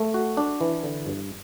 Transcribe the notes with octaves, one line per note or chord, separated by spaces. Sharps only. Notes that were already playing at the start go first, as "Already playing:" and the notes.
Already playing: A3
F#4
D4
E3
D3
G2